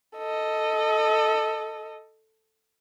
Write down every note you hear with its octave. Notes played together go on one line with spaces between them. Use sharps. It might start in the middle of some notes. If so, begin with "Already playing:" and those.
A4 D#5